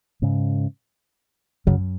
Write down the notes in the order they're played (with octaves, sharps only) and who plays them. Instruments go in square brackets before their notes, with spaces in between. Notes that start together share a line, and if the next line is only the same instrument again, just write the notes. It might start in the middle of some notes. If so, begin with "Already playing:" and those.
[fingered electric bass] G#2 C#3
[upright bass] F#2 [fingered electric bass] C#3 F#3